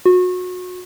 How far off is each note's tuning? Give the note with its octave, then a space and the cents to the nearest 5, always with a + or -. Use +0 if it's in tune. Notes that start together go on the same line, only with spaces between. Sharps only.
F#4 -30